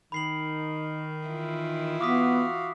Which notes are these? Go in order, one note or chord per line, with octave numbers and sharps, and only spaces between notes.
D#3 B5 C7 F#7
E3 E4 F4
B3 F#4 F5 D6 D#6 B6